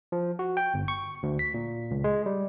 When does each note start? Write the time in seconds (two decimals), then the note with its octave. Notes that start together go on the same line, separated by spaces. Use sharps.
0.12 F3
0.39 F#4
0.57 G5
0.74 G1
0.88 C#6
1.23 D2
1.39 B6
1.54 A#2
1.91 C#2
2.04 G#3
2.26 G3